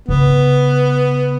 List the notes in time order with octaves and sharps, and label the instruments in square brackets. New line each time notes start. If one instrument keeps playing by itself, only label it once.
[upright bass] C#3 [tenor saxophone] B3